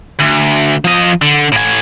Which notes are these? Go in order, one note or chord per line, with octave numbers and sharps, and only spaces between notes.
D2
F3 D#5
D3
A2 G#5